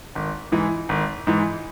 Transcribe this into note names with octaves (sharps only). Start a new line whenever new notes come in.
G#1
G#2 E3
G#1
G#2 E3